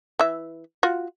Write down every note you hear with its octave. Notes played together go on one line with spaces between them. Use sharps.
E3 E5
F4 F#4